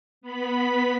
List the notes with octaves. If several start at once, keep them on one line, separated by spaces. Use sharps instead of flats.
B3 B5 B6